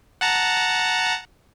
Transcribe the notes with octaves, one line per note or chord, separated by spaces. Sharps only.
F#5 A5 A#5